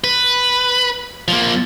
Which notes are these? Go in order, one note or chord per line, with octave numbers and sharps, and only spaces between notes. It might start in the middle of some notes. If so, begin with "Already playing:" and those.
B4
F3 A#3